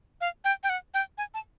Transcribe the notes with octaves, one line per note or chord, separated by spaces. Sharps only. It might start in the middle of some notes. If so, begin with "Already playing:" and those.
F5
G5
G5
F#5
G5
G#5
A5